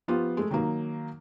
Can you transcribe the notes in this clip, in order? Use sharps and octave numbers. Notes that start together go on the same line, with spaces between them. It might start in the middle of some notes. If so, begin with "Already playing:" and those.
F3 B3 F4 G4
G#3 A3
D#3 F#3 A#3